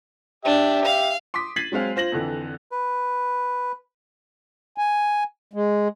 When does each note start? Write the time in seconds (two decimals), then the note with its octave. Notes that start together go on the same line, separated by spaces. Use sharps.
0.45 D4 G4 E5
0.86 F5
1.34 C6 D6 D#6 B6
1.56 G#6 A6 B6 C7 D#7 F#7
1.72 F#3 G#3 C4 F5
1.96 F4 C5 A#6 F#7
2.12 F2 D3 E3
2.72 B4
4.78 G#5
5.54 G#3